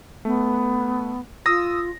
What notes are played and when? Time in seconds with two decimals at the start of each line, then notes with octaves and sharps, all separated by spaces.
0.25 A3 B3
1.46 F4 D#6 E6 A#6